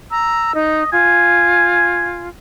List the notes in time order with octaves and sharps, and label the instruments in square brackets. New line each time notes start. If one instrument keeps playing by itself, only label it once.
[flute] A#5 [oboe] E6
[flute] D#4 [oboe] D#5
[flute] F4 [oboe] G#5